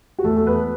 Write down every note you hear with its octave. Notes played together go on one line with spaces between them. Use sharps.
F#4
E2 A3 A4
A4
B3 B4